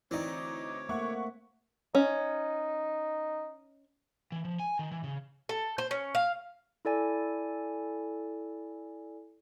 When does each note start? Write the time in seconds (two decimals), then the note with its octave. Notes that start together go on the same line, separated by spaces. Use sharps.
0.11 D2 E3 C4 D#4 C#5 D5 D6
0.89 A3 A#3 E5 F#5 C#6
1.95 C#4 D#4
4.32 E3
4.45 F3
4.60 G#5
4.79 D#3
4.92 E3
5.04 C#3
5.49 A4
5.78 C5
5.91 C#4
6.15 F5
6.85 E4 A4 D5 G#5